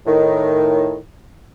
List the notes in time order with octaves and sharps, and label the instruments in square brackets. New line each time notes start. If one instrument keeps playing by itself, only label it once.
[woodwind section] A2 D#3